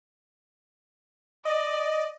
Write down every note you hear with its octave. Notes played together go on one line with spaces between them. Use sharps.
D5 D#5